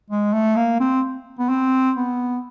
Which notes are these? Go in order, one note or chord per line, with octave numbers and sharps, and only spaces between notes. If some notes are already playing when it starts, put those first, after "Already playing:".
G#3
A3
A#3
C4
B3
C4
B3